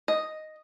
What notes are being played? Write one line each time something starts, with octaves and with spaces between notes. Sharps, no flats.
D#5